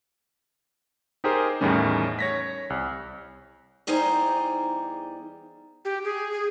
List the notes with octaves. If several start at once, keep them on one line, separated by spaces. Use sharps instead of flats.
D#4 G4 G#4 A#4 C5
E2 A2 D#3 G3 C#4
C#5 A#6 B6
C2
E2 G3 D#4 G#4 C5 A#5
G4
G#4
G#4